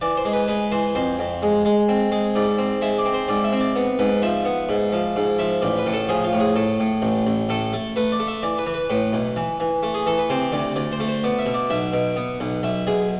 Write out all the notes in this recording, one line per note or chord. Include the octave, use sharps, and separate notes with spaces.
E3 D5
C5
G#3
B4
G#3 B4
E3 C5
F2 C5
F2
G#3
G#3
C4
G#3
G#2 D5
C4
G#3 E5
D5
C4
C5
G#2 D5
E5
C4
D5
B3
G#2 B4
F3 E5
B3
G#2
F3
G#2
F3 E5
A1 D5
B4
A2
A4
F3 G#4
F4
A2
G#4
A2 A4
A2
A1
A1
A2 A4
A3
A3 B4
D5
A3
E5
E3 D5
B4
E3
B4
A2 B4
B1
E3
E3
A3
G#4
E3 A4
B4
C3 C5
D2 D5
D2 D5
C5
A3
C5
B3 D5
E5
B2
D5
B1 E5
B2
B3
B1
B1 E5
B1 G#4